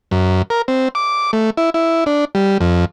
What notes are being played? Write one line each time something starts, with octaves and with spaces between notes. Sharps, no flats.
F#2
A#4
C4
D6
A3
E4
E4
D4
G3
F2